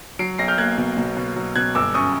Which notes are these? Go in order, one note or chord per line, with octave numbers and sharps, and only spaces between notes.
F#3 C7 D7
B1 A#6 C7
F6 G6
A#3 F#6 G#6
B2
B2
B2
F#3
B2 F#6 G#6
G1 D6 E6
F#2 C#6 D#6